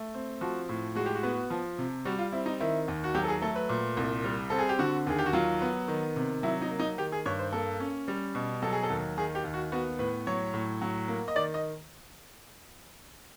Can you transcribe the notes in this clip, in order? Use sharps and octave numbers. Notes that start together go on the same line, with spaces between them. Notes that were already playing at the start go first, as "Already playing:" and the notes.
Already playing: A3
C4
F3 F#4
A2
G#3 F#4
G4
F#4
B3
F3
C3
G3 F#4
F4
C4 E4
D#4
D#3 E4
D#2
F#4
F#3 G4
A4
G#4
A3 A4
B4
A#2
C2
G3
C4 A4
G#4
G4
D3 F#4
D#2 G#4
G4
F#4
F#3 F4
B3
D#3
C3
F#3 E4
D#4
A#3
D#4
D#3 G4
G#4
G2 C#5
C5
A#3 A4
C#4
G3
B2
F#3 A4
G#4
A4
D#2
D#3 G#4
G4
D#2
F#4
B3 F#4
A2 B4
F#3 C#5
A2
F#3
A#3
D#5
D#3 D5
D#5